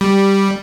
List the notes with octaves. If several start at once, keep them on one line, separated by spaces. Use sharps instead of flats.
G3